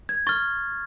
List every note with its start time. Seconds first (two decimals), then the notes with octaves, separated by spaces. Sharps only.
0.09 G#6
0.27 C#6 F6 A6